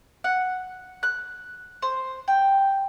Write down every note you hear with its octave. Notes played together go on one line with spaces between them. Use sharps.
F#5
F#6
C5
G5